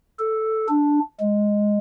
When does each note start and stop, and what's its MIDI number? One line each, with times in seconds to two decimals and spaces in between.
0.19 0.67 69
0.69 1.00 62
1.20 1.78 56